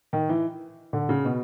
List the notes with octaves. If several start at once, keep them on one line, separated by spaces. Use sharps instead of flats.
D#3
E3
D3
C#3
B2